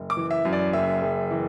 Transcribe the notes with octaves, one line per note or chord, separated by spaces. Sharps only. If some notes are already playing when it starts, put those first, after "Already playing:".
Already playing: F#1
D6
E3
E5
F#2
D5
F#1 E5
F#1
E3